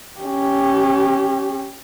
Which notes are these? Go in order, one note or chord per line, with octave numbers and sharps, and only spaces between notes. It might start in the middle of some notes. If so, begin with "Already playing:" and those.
C#4 G4